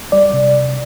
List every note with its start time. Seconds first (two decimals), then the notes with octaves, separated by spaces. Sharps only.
0.12 G3 D5
0.33 C3